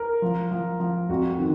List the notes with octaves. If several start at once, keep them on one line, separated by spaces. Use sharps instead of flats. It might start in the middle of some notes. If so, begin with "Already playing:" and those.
Already playing: A#4
F3
F3
F3
F2 F#4
D#3